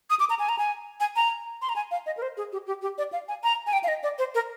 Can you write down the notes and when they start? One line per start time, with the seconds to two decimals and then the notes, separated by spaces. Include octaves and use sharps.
0.10 D#6
0.20 D6
0.30 A#5
0.39 G#5
0.49 A#5
0.59 G#5
1.00 G#5
1.16 A#5
1.62 C6
1.69 A#5
1.76 G#5
1.91 F5
2.06 D#5
2.17 A#4
2.22 C5
2.37 G#4
2.52 G4
2.67 G4
2.82 G4
2.98 D5
3.13 F5
3.28 G#5
3.44 A#5
3.67 G#5
3.73 G5
3.84 F5
3.88 D#5
4.03 D5
4.19 C5
4.35 A#4